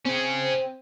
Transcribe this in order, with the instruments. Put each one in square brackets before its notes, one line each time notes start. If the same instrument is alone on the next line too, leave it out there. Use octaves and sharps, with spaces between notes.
[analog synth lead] C4 [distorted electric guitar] C#4 G#4